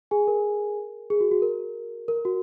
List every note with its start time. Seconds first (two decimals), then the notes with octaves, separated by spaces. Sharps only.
0.11 G#4 G#5
0.28 A#4
1.10 G#4
1.21 F#4
1.31 F#4
1.42 A#4
2.08 A#4
2.25 F#4